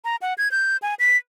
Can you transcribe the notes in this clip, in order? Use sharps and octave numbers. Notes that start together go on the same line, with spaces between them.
A#5
F#5
G#6
G6
G#5
B6